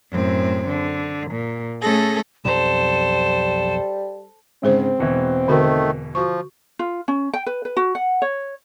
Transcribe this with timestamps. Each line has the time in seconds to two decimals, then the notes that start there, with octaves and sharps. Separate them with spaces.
0.10 F#2 A2 C4
0.68 D3
1.31 A#2
1.81 A3 C#4 G#4 A4 A#6
2.45 B1 F2 G3 A4 C5 A#5 E7
4.63 G#2 C#3 G#3 C4 G#4 C5
4.99 E1 B2 E3
5.48 D3 D#3 A3 F#4 A#4
6.15 F3 F#4 C#6
6.79 F4
7.08 C#4
7.33 G5
7.46 B4
7.65 B4
7.77 F#4
7.95 F#5
8.22 C#5